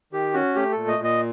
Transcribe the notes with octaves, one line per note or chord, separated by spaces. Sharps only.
D#3 G4
C#4 F#4
A3 G4
A#2 A4
D#5
A#2
D#5